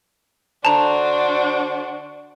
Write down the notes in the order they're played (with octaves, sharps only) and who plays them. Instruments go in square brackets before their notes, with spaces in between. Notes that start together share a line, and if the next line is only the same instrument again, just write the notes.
[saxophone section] D3 C5 [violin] D4 F#4 [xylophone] A5 A#5